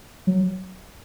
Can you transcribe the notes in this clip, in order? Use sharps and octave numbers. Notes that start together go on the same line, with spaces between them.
F#3